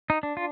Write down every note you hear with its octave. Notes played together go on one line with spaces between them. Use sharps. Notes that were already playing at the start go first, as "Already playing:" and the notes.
D#4
D4
F4